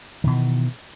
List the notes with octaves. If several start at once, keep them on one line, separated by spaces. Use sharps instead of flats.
B2 D#3 E3